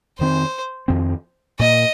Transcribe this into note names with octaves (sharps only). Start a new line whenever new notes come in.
F2 D#3 C4 C5
F2 D#3 C4
A#2 A#3 D#5